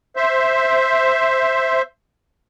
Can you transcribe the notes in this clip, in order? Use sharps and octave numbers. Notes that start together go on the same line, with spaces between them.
C5 E5